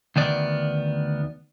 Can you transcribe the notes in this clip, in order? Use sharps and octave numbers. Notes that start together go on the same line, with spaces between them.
D2 D#3 B3 D5